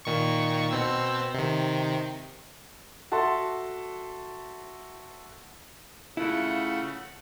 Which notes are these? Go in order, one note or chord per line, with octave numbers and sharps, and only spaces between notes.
A#2 D#3 C#6
B2 C4 E6
C3 D#3
F#4 A4 E5 A5 C6
C#3 A3 E4 F4 F#5